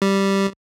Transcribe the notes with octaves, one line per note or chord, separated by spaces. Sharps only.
G3